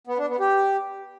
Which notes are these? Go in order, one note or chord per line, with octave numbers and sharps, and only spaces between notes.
B3
D4
B3
G4